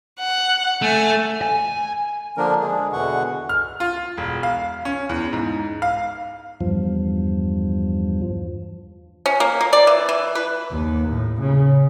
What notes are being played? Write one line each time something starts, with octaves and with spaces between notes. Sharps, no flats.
F#5
A3 G#5
G#5
D3 F3 A#3 D4 A#4
G#3 D4 G#4
E2 B2 D3 E3 F#5 C#6
F6
F4
E1
F5
C#4
E2
G#2
F5
E2 G2 F3
C#4
A#3
A#3
D5
E3
E3
B4
D#2
A2
C#3